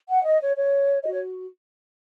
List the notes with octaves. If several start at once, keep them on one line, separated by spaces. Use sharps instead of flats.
F#5
D#5
C#5
C#5
F#4 C#5 D#5
C#5